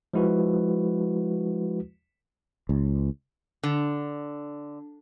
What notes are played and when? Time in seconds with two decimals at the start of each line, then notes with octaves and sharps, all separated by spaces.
0.14 F3 G#3 E4 F#4 B4
2.69 C#2
3.63 D3